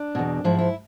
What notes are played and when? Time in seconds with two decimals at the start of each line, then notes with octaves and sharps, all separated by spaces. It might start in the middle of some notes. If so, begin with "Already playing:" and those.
Already playing: D4
0.15 E2 B2
0.44 G#2 F3 E4
0.58 E4